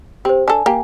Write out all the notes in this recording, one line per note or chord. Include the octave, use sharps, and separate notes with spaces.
C4 G4 C5
D4 A4 G#5
A#3 G4